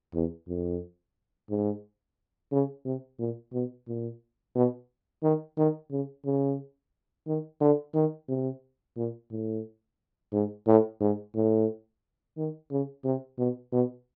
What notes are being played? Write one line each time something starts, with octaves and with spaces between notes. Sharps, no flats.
E2
F2
G#2
C#3
C3
A#2
B2
A#2
B2
D#3
D#3
C#3
C#3
D#3
D3
D#3
C3
A#2
A2
G#2
A2
G#2
A2
D#3
C#3
C3
B2
B2